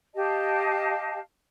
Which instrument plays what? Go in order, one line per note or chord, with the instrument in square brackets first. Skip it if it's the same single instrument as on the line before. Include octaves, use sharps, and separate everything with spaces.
[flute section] G4 D#5 F5 A5